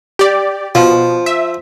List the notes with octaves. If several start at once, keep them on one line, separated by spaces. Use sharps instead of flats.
G4 D5
B2 F3
E5